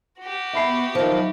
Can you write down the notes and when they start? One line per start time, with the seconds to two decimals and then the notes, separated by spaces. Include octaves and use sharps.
0.21 F#4 G4
0.53 B3 E5 B5 C#6 C7
0.95 D#3 F3 F#3 D#4